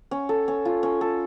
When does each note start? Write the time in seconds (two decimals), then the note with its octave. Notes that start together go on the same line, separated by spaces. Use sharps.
0.11 C#4
0.29 A4
0.48 C#4
0.65 F4
0.83 C#4
1.01 A4